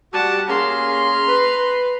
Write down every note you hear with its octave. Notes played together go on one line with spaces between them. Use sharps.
G3 F#4 G4 F#5 A5
A#3 C#4 G#4 A#5 C6
B4